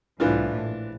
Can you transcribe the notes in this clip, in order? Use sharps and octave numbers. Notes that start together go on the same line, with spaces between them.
C2 A2 E3 D4 F4
A#1